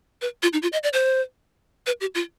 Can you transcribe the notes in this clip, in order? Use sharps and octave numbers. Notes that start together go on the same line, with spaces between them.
B4
F4
D#4
F4
D#5
D5
C5
B4
G4
F4